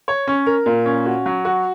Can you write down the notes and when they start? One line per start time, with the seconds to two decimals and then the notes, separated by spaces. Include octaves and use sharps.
0.08 C#5
0.28 C#4
0.46 A#4
0.66 A#2
0.86 C#4
1.06 F#4
1.26 F#3
1.45 F#4